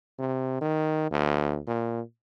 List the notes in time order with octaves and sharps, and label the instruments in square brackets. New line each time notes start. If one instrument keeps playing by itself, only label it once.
[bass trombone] C3
D#3
D2
A#2